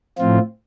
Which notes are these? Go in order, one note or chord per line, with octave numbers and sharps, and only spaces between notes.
A2 F3 C4 F4